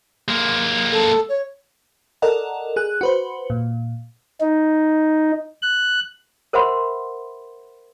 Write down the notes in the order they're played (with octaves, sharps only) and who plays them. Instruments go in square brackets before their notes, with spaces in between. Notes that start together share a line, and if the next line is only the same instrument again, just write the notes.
[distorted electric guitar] G#3 A#3
[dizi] A4
C#5
[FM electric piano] A4 A#4 D5 D#5 F#5
G#4 F#6
F#4 B4 C5
A#2
[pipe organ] D#4
F#6
[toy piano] A#4 C5 E5 F#5 B5 C6